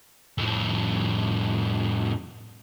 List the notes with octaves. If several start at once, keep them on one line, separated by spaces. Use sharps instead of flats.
F2 A2